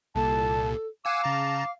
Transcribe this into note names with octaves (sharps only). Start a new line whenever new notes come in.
C2 A#2 A4 A5
F5 F#5 G#5 D6 E6
C#3 A5 A#5